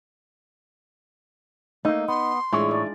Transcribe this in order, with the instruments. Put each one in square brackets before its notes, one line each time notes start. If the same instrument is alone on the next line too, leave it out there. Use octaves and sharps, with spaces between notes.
[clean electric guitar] A3 A#3 [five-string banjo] D#4
[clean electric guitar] B3 [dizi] C6
[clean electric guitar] A2 C#5 [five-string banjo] E3 [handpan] G#3 D4 F4
[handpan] D#4 D5